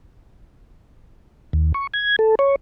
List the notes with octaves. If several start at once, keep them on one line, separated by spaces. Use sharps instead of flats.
D#2
C#6
G#6
A4
C#5